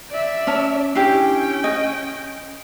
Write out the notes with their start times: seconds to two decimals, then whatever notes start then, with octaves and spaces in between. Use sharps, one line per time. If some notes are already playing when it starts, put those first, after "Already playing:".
0.10 D5 E5
0.47 C#4 C#5 A5
0.95 C#4 D4 E4 G4 G5
1.64 D#5